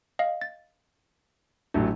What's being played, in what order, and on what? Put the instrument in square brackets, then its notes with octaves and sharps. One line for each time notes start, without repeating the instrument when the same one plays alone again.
[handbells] D#5 F5
A6
[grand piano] A1 F#3 A3 [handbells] D4